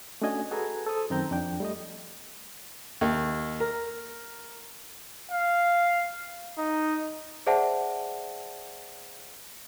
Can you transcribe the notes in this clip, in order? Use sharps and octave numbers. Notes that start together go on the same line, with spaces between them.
A3 C#4 D4 F#4 D#5 G#5
F#4 G#4 A4 B4 G#5 A#5
A4 C5 D#6
F#2 D#3 C4 G5 A#5 G6
F2 D4 G5
G3 A3 D#5
D#2
A#4
F5
D#4
G#4 C5 D5 E5 F#5 A5